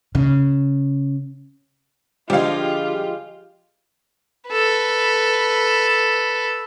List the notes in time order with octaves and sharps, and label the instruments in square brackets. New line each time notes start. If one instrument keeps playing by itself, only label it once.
[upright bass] C#3
[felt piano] D3 G3 [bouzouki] F3 G#3 [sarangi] F4 [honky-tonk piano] G4 F5
[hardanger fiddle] A4 B4